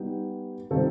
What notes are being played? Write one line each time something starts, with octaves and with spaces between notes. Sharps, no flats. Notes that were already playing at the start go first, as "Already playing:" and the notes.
Already playing: G3 B3 D#4 G4
D#3 G3 C4 F4 A4